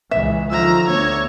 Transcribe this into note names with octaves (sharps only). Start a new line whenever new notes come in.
C#2 E3 E5
D3 D#3 F3 A#5 E6
D2 B3 C#5